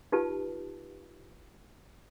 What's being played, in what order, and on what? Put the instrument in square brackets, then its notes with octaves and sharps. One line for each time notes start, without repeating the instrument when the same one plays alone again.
[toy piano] D#4 F4 G4 B4 A5